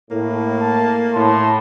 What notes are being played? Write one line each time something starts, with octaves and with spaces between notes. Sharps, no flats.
A2 A#3
A5
A2 A5 C6